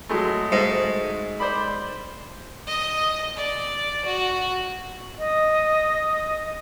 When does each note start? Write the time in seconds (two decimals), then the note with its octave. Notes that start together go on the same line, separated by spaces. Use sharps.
0.09 F#3 G#3 A3
0.52 G#2
1.40 C5 D5 B5
2.66 D#5
3.36 D5
4.05 F#4
5.19 D#5